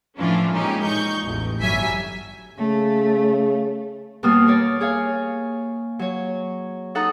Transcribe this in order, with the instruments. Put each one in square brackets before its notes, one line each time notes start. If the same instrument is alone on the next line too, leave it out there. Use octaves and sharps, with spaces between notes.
[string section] A2 E3 F3 C#4 D4 F4
A#2 E3 G#3 C#4 D#4 G4
A#2 D#4 C#6 G6
A1 E2
G1 F#3 G3 E5 G#5 B6
[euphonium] C#3 [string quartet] A3
[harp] D#2 B2 G3 A#3 D#6 F6
A#4 C#5 D5
G#4 C#5 F5
F#3 C#5
D#4 A4 F#5 A#5 D#6